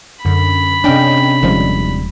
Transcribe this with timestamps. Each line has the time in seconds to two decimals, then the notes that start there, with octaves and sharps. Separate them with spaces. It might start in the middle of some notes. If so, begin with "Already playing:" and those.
0.25 F#2 D3 B5
0.84 C3 C#4 D4 D#5 G5
1.43 D#1 D#3 F3 G3 G#3 C#4